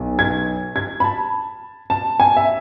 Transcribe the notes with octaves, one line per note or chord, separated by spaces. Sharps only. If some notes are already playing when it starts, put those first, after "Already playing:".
Already playing: B1 B2
G#6
G#6
B5
A5
A5
G#5
E5